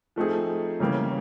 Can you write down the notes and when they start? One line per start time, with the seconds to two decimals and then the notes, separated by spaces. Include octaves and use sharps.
0.16 F3 A3 C4 D#4 G#4
0.80 C#3 E3 G3 A#3 C#4